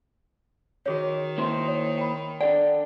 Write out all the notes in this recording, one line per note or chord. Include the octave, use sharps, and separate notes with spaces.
D#3 F#4 G#4 C#5
A#3 E4 C5
C#5
G5 B5
D4 A4 D5 F#5 G5